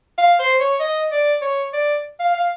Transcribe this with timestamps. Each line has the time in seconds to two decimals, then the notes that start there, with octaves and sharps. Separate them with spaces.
0.18 F5
0.39 C5
0.60 C#5
0.80 D#5
1.12 D5
1.42 C#5
1.73 D5
2.19 F5
2.34 F5